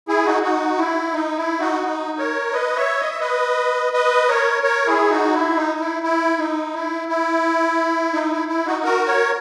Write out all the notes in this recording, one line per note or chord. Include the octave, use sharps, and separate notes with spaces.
E4 G#4
D#4 F#4
D#4 F#4
E4
D#4
E4
D#4 F#4
D#4
A#4 C#5
B4 D#5
C#5 E5
D#5
E5
B4 D#5
B4 D#5
A#4 C#5
A#4 C#5
E4 G#4
D#4 F#4
E4
D#4
E4
E4
D#4
E4
E4
D#4
E4
E4
D#4 F#4
F#4 A#4
A#4 C#5